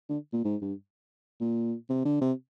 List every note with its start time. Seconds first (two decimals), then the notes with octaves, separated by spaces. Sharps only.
0.09 D3
0.33 A#2
0.45 G#2
0.62 G2
1.41 A#2
1.90 C3
2.05 D3
2.21 C3